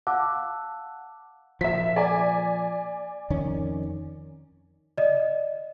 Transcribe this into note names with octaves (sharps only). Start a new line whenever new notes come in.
F5 F#5 A5 D6 E6 F#6
A#2 F3 E5 B6
D5 G#5
F2 D#3 C#4
D5 D#5